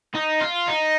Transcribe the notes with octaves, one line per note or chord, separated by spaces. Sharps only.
D#4
F4
D#4